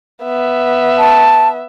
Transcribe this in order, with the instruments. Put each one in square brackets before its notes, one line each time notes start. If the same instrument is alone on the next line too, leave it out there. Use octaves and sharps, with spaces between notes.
[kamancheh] B3 E5
[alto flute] A5